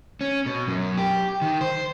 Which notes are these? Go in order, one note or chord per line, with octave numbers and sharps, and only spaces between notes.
C#4
B2
F#2
G4
D#3
C5